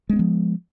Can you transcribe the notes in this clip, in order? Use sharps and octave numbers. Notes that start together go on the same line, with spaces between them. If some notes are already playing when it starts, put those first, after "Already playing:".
F3 G#3 B3 C4